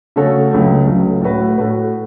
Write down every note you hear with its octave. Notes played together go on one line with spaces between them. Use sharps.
C#3 A3 F#4 A4 C#5
C#2 C#3 F#3 A3
C#2 C#3 F#3 A3
A2 A3 F#4 B4
A2 A3 F#4 B4